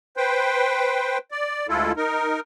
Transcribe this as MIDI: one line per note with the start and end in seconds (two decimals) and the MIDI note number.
0.17 1.18 71
0.17 1.18 72
0.17 1.18 79
1.31 1.67 74
1.69 1.92 38
1.69 1.92 56
1.69 1.92 64
1.69 1.92 65
1.69 1.92 69
1.97 2.40 63
1.97 2.40 70